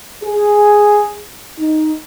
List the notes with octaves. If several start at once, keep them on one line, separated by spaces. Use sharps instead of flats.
G#4
D#4